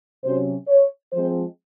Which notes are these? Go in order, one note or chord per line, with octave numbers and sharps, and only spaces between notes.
C3 F#3 C#4 C5
C#5
F3 G#3 C4 C5